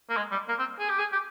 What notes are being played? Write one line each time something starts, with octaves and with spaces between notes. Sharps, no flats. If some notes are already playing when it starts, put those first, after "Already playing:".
A#3
G#3
G3
A#3
C4
G#4
G4
G#4
G4